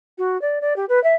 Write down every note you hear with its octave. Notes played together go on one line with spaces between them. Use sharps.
F#4
D5
D5
G4
B4
E5